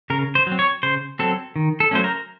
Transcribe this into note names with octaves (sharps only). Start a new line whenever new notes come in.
C#3 A#4
C5
F#3
C4
C#5
C#3 C5
F#3 C4 A4
D#3
A4
F#3 A3 C#4 C5
A#4